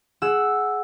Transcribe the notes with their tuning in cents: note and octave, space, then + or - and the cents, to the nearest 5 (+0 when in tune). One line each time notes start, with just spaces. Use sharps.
G#4 +15 F#5 +0 E6 +0